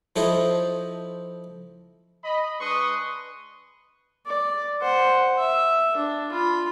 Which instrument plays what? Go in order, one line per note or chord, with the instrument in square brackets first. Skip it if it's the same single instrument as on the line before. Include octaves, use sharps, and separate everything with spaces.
[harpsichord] F3 E4 A4 C5 C#5 D#5
[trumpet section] D#5 B5
G#3 D4 B4 C6 C#6 D#6
[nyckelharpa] D5
C5 F#5
E5
D4
F4 B5